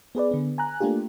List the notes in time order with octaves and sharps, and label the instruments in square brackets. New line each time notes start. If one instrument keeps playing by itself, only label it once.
[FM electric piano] B3 G#4 B4 D5
D3 B3
G#5 A#5 F#6
A3 A#3 D4 F4 G4